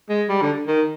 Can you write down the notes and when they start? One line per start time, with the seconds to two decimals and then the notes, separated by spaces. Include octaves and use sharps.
0.09 G#3
0.29 G3
0.42 D3
0.67 D#3